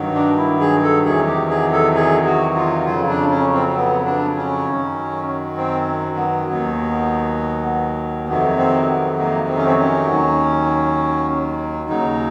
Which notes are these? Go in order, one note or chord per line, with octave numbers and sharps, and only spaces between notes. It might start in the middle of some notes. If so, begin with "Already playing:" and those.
Already playing: G2 D#3 F#3
D4
E4
G#4
A4
E2 C3 D#3 F#3 G#4
G4
G#4
A4
G#4
F#4
F4
F2 C#3 F#3 F4
D4
C#4
C4
C4
B3
D4
C#4
F#2 D#3 F#3
C4
B3
D#2 D#3 F#3
F2 C3 D#3 F#3 B3
C4
B3
A#3
C4
C#4
C4
C#4
D#2 D#3 F#3
D#2 C#3 F#3 D#4